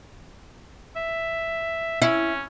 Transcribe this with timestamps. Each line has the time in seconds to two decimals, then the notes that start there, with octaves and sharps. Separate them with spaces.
0.96 E5
2.02 C#4 E4